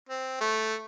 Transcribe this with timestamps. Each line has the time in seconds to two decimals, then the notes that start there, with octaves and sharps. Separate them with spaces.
0.09 C4
0.41 A3